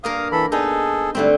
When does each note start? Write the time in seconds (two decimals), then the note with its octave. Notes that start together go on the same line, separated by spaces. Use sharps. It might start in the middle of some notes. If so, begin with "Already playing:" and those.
0.04 G2 A#3 A#4 F5 D#6
0.32 E3 A4 B5
0.52 B3 D#4 G#4 A4
1.15 G#2 D3 G3 A3 C4